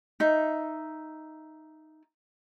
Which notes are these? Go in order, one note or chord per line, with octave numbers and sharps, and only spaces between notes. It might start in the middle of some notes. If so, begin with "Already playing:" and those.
D#4 E5